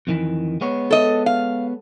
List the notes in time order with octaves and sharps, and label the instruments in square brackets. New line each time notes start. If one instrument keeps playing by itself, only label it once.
[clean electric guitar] F2 D#3 E3
G#3 B3 C#5
[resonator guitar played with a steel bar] A4 D#5
F5